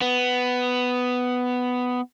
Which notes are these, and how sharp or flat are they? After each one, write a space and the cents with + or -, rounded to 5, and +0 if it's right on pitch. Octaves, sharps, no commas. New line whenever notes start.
B3 +10